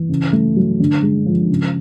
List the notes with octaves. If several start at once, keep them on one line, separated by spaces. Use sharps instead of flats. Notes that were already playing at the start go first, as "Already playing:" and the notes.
Already playing: E3
C#3
A3
F#3
D3
G#3
F3
C#3